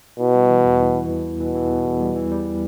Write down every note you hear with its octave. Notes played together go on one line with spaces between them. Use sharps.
B2 E4
G3
E3
E2
E3
E4
E2
E2
B2 E3
E3
E2
E2
G3
E3
G3